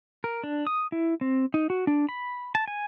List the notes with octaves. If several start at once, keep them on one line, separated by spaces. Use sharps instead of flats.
A#4
D4
D#6
E4
C4
D#4
F#4
D4
B5
A5
G#5